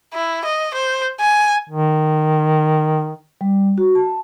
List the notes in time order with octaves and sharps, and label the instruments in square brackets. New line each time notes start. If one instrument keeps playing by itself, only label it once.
[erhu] E4
D#5
C5
G#5
[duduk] D#3
[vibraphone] G3
F#4
A5